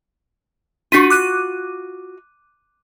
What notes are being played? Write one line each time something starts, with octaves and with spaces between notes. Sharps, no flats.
D4 F4 F#4 B6 D#7
D6 F#6 D#7